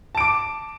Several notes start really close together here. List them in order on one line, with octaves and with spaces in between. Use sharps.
A5 D7 D6